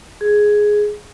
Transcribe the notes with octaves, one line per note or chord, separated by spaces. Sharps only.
G#4